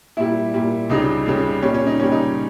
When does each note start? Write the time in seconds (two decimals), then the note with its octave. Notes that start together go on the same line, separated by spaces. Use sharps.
0.17 A#2 G3 E4
0.54 A#2 G3
0.89 C#2 C#3 G3 D#4
1.26 C#2 C#3 G3
1.62 A#2 G3 C#4
1.74 C#4
1.86 D#4
1.99 A#2 C#4
2.03 G3
2.12 D#4